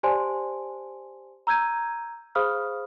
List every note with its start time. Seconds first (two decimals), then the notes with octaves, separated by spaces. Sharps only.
0.03 G4 C5 D5 G#5 A5 C6
1.47 A#5 E6 G6 G#6 D#7
2.35 G#4 C5 F5 B5 D#6 F6